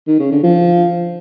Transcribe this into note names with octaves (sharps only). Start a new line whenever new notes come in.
D#3
C#3
D3
F3